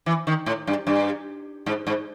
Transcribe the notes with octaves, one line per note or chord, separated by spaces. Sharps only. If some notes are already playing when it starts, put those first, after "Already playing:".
E3
D#3
A2
G2
G2
G#2
G#2